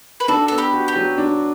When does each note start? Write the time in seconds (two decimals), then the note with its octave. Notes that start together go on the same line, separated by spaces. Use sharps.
0.20 B4
0.28 D4 F#4 A4
0.48 B3 A4
0.58 G4 B4
0.73 F#4
0.88 G4
0.96 F#3
1.18 D4